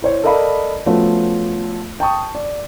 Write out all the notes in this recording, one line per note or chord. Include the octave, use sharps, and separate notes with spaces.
E4 C5 C#5
A4 A#4 D5 D#5 F5 B5
F3 A3 B3 C#4 F4 F#4
G5 A5 C#6 D#6
D5